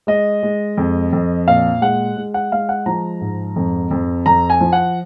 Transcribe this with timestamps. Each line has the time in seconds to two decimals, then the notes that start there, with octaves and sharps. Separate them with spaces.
0.07 G#3 D#5
0.43 G#3
0.77 F2
1.13 F2
1.47 A#2 F5
1.82 G#3 F#5
2.17 G#3
2.34 F#5
2.52 G#3 F5
2.69 F#5
2.86 F3 A#5
3.21 G#2
3.56 F2
3.91 F2
4.26 F2 A#5
4.50 G#5
4.60 F3
4.73 F#5